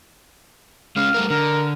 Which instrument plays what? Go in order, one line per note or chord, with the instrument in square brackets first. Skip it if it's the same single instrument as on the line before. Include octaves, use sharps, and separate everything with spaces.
[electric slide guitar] G#3 C#4 [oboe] F5
[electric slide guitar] G3 A3 A#4
[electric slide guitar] D3 [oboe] A#4